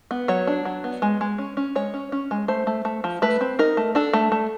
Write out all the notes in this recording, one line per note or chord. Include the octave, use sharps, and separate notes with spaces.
B3
F#3 C#5
D4
F#3
B3
G#3
G#3
C#4
C#4
G#3 C#5
C#4
C#4
G#3
A3 C5
A3
A3
F3
A3 B4
C4
D#4 A#4
A3
D4 A4
A3
A3